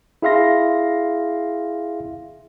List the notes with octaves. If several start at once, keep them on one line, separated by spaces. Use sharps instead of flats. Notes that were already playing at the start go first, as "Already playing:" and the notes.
E4 G#4 E5 F5 C6 A#6